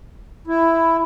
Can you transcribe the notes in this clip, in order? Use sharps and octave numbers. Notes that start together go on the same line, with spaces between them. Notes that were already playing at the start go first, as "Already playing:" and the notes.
E4